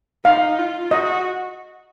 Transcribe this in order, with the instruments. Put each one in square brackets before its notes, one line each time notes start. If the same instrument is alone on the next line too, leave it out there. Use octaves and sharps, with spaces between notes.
[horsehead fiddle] D#4 [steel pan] F5
[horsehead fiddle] F4
[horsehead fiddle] F#4 [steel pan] D#5